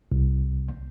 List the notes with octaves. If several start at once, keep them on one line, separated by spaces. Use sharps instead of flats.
C2